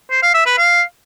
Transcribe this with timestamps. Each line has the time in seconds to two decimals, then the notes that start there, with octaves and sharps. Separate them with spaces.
0.11 C5
0.23 F5
0.34 E5
0.46 B4
0.58 F5